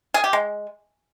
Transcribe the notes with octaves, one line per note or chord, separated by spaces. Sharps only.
G#4
G4
G#3